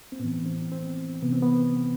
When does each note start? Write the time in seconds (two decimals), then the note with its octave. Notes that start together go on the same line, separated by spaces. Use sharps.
0.12 C4
0.20 A2 B3
0.24 E3
0.46 C4
0.72 C4
1.22 C3 E3 B3
1.32 C4
1.42 B3